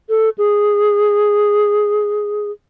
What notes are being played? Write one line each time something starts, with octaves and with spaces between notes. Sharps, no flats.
A4
G#4